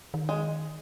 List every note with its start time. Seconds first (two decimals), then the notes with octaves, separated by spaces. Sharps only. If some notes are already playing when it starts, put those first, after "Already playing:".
0.14 D#3
0.29 G#3